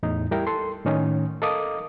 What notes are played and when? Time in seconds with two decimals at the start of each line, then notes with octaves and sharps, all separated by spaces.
0.03 E2 A2 D#4
0.31 G3 E4 A#4 G5
0.47 A4 C6
0.85 A2 D#3 C#4 D#4
1.42 A4 A#4 D#5 F5 D6 D#6